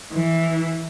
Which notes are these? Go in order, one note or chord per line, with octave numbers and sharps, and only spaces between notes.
E3